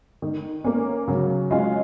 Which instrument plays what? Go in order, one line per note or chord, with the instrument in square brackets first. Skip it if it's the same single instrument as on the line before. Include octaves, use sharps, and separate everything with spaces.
[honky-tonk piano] D#3
A#3 C#4
[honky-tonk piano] C#3 [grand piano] F#3
[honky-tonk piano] G#3 C#4 F4